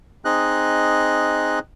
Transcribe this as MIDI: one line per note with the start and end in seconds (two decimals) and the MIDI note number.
0.25 1.59 60
0.25 1.59 63
0.25 1.59 68
0.25 1.59 75
0.25 1.59 90